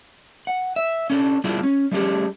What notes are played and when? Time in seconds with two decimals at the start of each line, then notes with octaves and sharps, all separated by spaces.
0.47 F#5
0.76 E5
1.10 C#4 D4 A4
1.44 G3 B3 D4 E4 F4 G#4
1.63 C#4
1.92 G3 A3 C#4 G4 G#4